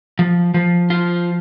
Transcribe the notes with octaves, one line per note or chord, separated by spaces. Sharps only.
F3
F3
F4